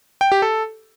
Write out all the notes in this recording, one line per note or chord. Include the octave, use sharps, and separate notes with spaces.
G5
G4
A4